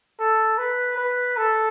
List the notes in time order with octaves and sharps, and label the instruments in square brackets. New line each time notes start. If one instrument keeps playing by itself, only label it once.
[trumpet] A4
B4
B4
A4